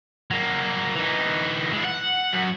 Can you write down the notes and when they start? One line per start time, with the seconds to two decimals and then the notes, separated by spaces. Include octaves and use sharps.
0.31 F#3 A#3
0.95 E3 D#4
1.73 G#3 E4
1.85 F#5
2.33 F#2